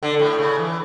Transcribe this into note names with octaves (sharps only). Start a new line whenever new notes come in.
D3
A2
C#3
E3